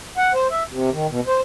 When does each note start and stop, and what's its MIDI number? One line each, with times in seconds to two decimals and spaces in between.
0.18 0.33 78
0.34 0.47 72
0.51 0.63 76
0.71 0.90 48
0.91 1.07 51
1.09 1.20 47
1.27 1.41 72